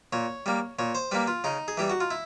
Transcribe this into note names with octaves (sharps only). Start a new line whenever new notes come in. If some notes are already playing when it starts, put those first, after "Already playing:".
A#2 C#5
G3 A#3
A#2 C#5
C5
G3 A#3 B4
F4
C#3 D#4
G#4
E3 G3 G4
F#4
F4
E4